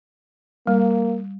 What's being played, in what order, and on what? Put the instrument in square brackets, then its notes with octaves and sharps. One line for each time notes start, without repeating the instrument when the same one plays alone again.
[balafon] G3 [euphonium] A#3